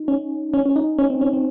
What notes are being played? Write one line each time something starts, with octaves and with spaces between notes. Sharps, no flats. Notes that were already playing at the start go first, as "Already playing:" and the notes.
Already playing: D#4
C#4
C#4
C#4
D#4
C#4
C4
C#4
C4